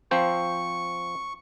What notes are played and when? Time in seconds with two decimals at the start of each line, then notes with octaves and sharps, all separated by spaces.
0.11 F3 C4 C5 C#6